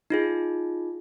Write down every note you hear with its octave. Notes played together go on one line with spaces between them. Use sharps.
D#4 F4 G#4